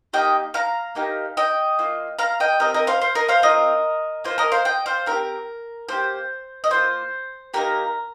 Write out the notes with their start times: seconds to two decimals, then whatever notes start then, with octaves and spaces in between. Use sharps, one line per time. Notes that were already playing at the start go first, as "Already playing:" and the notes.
0.13 A#3 D#4 G4 D#5 G5
0.54 F5 A#5
0.95 A#3 D#4 G4
1.37 D#5 G5
1.79 A#3 F4
2.19 F5 A#5
2.40 D#5 G5
2.60 C4 G4 A#4 D#5
2.74 A#4 D#5
2.87 C5 F5
3.02 C5
3.15 A#4 D#5
3.29 C5 F5
3.42 C4 F4 A#4 D#5
4.24 A#3 F4 C5
4.38 A#4 D#5
4.52 C5 F5
4.65 D#5 G5
4.86 C5 F5
5.06 C4 D#4 A#4
5.11 G4
5.89 A#3 G4 C5
6.64 D#5
6.71 A#3 F4 C5
7.54 A#3 D#4 G4 A#4